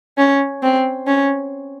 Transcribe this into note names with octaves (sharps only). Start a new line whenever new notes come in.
C#4
C4
C#4